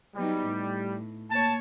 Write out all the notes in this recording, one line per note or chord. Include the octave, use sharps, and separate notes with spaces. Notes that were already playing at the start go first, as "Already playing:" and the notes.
F#3 G3 B3 D#4
A2
A#3 C#5 A5